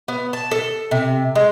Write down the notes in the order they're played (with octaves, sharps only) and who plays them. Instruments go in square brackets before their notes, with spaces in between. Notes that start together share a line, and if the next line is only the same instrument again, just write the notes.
[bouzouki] B3
A5
A4
C3
G#3